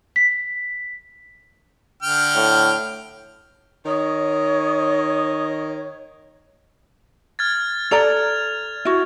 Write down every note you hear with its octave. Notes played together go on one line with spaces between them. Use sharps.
B6
D3 G5 F6
A2
D#3 C#5 D#5
F6 G#6 A6
A4 D5 A#5 F7
E4 F#4